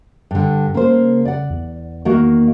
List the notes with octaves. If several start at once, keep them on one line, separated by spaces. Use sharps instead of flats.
G2 D3
C#3 A#3 C5
D5 F#5
E2
D#3 A#3 F#4